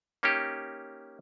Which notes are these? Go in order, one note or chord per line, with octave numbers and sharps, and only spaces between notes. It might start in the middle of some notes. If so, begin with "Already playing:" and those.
A#3 C#4 D#4 G4